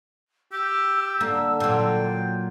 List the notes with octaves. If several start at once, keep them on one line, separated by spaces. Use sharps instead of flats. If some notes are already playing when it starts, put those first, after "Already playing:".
G4 E6
D3 A#3
A#2 F#3 G5